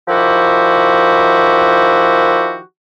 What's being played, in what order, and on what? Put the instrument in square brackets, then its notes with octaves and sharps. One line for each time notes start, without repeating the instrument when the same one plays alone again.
[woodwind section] D#3 F3 E4 F#4 G4